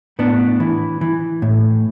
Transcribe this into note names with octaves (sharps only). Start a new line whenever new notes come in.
A2 B3 D4
E3
E3
A2